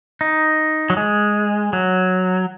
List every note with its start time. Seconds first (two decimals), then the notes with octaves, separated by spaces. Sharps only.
0.21 D#4
0.90 F#3
0.97 G#3
1.73 F#3